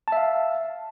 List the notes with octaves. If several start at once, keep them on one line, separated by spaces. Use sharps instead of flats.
E5 F5 A5